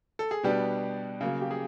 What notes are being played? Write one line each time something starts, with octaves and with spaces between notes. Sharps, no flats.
A4
G#4
B2 G3 B3 D4 G4
C#3 F#3 A#3
G4
G#4